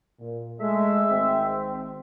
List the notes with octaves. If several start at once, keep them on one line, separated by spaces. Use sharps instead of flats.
A#2
G#3 A3 E5
G#1 C4